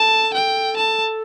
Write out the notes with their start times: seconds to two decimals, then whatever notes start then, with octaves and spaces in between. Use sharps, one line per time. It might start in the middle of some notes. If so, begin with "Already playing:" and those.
Already playing: A4 A5
0.34 G5
0.77 A5